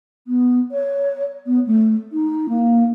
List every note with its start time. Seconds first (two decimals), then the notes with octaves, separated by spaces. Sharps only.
0.27 B3
0.71 C#5
1.46 B3
1.66 A3
2.12 D#4
2.49 A#3